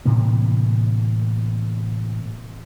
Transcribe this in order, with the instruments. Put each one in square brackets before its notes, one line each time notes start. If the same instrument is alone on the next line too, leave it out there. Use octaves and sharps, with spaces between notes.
[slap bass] A2 C3 E3 A#3